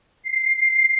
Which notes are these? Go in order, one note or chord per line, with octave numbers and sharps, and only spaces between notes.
C7